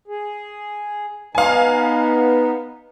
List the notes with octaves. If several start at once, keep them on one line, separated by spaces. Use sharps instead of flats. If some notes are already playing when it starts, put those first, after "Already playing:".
G#4
B3 D#4 F5 G#5